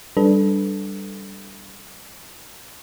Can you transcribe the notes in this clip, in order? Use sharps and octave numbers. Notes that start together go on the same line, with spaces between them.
G3 D4 A4 B4